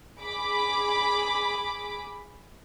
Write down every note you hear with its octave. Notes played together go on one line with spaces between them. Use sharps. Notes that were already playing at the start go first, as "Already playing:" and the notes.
G#4 B5 D6